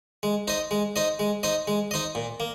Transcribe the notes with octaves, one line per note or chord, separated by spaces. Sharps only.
G#3
D#4 C5 D#5
G#3
D#4 C5 D#5
G#3
D#4 C5 D#5
G#3
D#4 C5 D#5
A#2
A#3